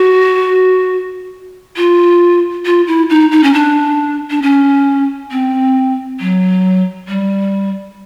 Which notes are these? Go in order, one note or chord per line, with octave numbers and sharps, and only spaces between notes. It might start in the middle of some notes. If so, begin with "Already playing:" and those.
Already playing: F#4
F4
F4
E4
D#4
D#4
C#4
D4
D4
C#4
C4
F#3
G3